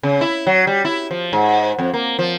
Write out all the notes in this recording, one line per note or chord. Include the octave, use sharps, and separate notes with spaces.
C#3
E4
F#3
G3
E4
F3
G#2
F2
A#3
F3